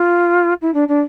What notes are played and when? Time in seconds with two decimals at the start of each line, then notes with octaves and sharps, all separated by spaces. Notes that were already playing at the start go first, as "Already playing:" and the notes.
Already playing: F4
0.62 E4
0.74 D4
0.88 D4